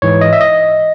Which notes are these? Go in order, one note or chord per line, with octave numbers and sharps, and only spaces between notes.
G#2 E3 C#5
D#5
E5
D#5